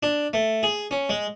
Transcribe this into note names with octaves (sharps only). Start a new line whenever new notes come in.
D4
A3
G#4
C#4
G#3